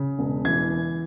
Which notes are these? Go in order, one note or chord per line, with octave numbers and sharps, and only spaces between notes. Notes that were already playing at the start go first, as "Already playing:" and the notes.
Already playing: C#3
E1
E3 G#6